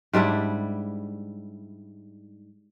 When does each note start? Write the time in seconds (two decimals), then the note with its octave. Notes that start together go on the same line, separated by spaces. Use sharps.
0.13 G#2 G3 D4 E4